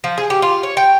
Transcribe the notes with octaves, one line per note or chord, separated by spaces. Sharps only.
F3
G#4
G4
F4
C#5
G5